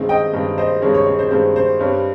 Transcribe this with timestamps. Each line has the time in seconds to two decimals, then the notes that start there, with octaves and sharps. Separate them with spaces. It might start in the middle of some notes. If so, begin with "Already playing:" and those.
Already playing: G2 D#3 G#3 C4
0.09 D#5 G5
0.33 G2 D#3 G#3 C4
0.58 C5 D#5
0.82 G2 D#3 G#3 C4 C#5
0.94 C#5
1.07 C#5
1.19 C5
1.31 G2 D#3 G#3 C4 C5
1.56 C5
1.79 G2 G3 C4 C#5